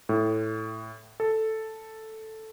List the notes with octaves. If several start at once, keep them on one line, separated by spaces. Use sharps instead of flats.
A2
A4